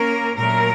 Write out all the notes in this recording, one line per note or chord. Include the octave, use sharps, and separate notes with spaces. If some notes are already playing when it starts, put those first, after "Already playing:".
Already playing: A#3 C#4 A#4
A#2 F#3 A3 A#4